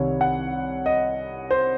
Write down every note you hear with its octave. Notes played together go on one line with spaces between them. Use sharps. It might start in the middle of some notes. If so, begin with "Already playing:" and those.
Already playing: C2 C3 D#3 C#5
F#5
D#5
C5